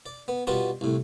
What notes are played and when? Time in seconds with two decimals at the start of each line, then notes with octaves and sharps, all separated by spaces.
0.06 D5
0.28 B3
0.47 B2 G3 B3 F4 F#4 A5
0.81 C2 A2